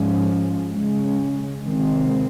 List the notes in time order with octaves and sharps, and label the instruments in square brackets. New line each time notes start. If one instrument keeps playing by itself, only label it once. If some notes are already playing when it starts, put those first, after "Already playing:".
Already playing: [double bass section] G#2 F3 G#3 C#4
C#3 G#3 C#4
C3 D#3 G#3 C4